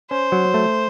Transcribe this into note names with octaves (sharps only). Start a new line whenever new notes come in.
C#4 C5
F#3
A3